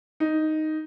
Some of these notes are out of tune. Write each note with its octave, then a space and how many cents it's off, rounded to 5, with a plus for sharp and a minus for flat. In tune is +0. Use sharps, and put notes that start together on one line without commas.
D#4 +0